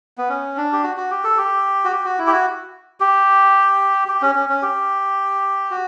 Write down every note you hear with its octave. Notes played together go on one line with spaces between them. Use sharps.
B3
C#4
D4
G4
F#4
F#4
G4
A4
G4
F#4
G4
F#4
E4
G4
F#4
G4
G4
C#4
C#4
C#4
G4
F#4